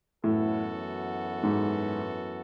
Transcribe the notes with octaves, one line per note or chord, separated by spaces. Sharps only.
F#2 A2 E3 B3 F#4 A4
G#2